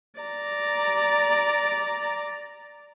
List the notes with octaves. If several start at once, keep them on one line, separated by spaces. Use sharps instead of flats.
D5 A#5